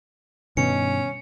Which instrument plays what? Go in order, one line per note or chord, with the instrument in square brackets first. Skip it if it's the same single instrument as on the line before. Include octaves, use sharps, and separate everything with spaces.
[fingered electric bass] G2 D#3 [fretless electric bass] B2 [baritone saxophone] C#4 [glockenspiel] C#7